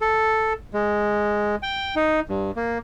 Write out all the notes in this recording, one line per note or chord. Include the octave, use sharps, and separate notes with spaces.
A4
G#3
G5
D#4
G2
A#3